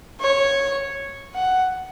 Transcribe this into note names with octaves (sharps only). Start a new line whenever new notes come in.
C#5
F#5